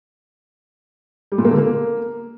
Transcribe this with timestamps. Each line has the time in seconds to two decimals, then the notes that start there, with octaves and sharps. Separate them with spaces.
1.32 G3
1.38 A#2
1.45 A#3
1.51 D3
1.58 A#3